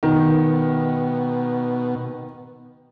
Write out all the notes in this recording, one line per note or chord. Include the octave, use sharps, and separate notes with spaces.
B2 D#3